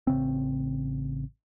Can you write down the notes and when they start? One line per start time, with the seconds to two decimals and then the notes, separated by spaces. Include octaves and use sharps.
0.07 A1 C#3 C4